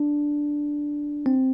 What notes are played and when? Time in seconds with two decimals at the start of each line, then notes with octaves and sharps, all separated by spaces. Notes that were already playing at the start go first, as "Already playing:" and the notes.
Already playing: D4
1.26 C4